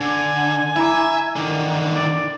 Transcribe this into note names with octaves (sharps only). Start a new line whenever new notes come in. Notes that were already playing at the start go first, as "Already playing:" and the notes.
D3 G#5
E4 E5 A#5 D6
D3 D#3
D5